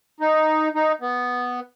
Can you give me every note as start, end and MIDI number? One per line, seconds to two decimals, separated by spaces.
0.21 0.68 63
0.75 0.92 63
1.01 1.60 59